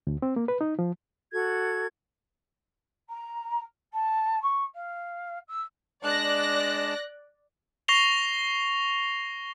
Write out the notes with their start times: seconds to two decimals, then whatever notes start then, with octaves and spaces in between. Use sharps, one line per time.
0.07 D2
0.22 C4
0.36 A#3
0.48 B4
0.61 D#4
0.79 F3
1.32 F#4 A4 G#6
3.09 A#5
3.93 A5
4.42 C#6
4.74 F5
5.48 E6
6.04 G#3 D4 D5 A5 F#6 A#6
7.88 C#6 A#6 C7 F7 G7